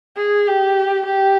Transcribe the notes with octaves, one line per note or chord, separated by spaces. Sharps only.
G#4
G4
G4